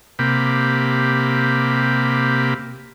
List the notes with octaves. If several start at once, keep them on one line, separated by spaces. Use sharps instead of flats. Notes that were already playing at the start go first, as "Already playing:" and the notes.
C3 A#3 G4 B5